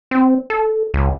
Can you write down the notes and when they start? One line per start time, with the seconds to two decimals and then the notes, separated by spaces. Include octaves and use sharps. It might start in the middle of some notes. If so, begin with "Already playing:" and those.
0.11 C4
0.50 A4
0.94 C#2